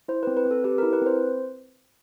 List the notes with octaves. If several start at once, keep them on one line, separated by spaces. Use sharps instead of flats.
E4 C5
B4
C4
B4
C4
A4
G4 B4
A#4
E4
B4
C4 C5